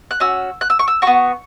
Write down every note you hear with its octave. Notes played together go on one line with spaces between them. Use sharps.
F#6
C#4 F#4 E6
F#6
E6
C#6
E6
B3 F#4 C#6